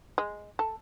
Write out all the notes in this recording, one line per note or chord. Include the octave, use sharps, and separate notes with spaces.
G#3
A4